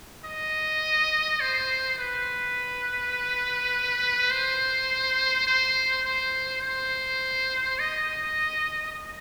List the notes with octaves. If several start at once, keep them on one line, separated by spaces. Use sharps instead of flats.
D#5
C5
B4
C5
C5
C5
C5
D#5